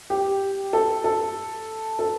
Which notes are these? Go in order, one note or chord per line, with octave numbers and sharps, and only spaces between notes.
G4
A4
A4
A4